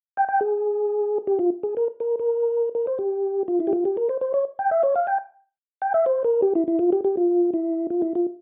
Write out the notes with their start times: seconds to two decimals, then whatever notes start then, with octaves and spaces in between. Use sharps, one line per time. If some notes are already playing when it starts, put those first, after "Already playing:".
0.17 G5
0.29 G5
0.41 G#4
1.27 G4
1.39 F4
1.63 G#4
1.77 A#4
2.00 A#4
2.19 A#4
2.75 A#4
2.87 C5
2.99 G4
3.48 F4
3.60 E4
3.67 G4
3.73 F4
3.85 G4
3.97 A#4
4.09 C5
4.21 C5
4.34 C#5
4.59 G5
4.71 E5
4.83 C#5
4.96 F5
5.07 G5
5.82 G5
5.94 E5
6.06 C5
6.24 A#4
6.42 G4
6.55 E4
6.68 E4
6.79 F4
6.92 G4
7.05 G4
7.17 F4
7.54 E4
7.90 F4
8.02 E4
8.15 F4